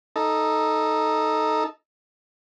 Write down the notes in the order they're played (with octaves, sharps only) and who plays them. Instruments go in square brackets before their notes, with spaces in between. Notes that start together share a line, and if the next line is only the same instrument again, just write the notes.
[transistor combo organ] D#4 A4